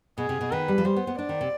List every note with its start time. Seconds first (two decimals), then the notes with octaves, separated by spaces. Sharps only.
0.18 B2 G#4
0.29 C3
0.41 B2
0.52 D#3 B4
0.68 G3
0.78 F3
0.85 G3 C5
0.96 B3
1.07 B3
1.19 D4 D5
1.29 D#3
1.41 C3